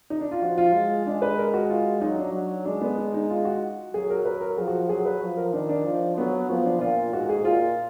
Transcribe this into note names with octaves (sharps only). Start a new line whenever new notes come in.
D#4
D4
F4
F3 F#4
F4
G#3
G#3 D4
B4
A#4
F#4
F4
F#3 D#4
D4
F#3
G#3 D4
B3
D4
D#4
F4
F#4
F#3 G#4
A#4
B4
A#4
F3 G#4
F#4
F#3 G#4
B4
F3
A#4
D#3 D4
D4
F3
F#3 B3
F3 B3
D4
A#2 F4
G#2 F#4
G#4
A#2 F4